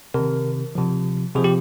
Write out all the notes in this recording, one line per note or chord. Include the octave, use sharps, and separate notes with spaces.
C3 A#4
D#3
C3 F3
C3 F3 G#4
G4